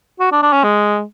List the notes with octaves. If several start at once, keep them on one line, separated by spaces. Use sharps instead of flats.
F#4
D4
D4
C#4
G#3